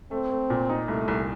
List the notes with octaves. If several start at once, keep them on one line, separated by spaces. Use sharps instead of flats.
A3 C4
A3
A#2
D#4
C2 A3
C2